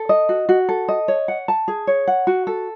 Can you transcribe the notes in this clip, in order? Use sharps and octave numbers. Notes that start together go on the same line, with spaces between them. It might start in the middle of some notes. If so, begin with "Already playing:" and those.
Already playing: A4
D#5
F#4
F#4
A4
D#5
C#5
F#5
A5
G#4
C#5
F#5
F#4
A4